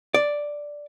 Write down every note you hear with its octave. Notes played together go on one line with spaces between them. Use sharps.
D5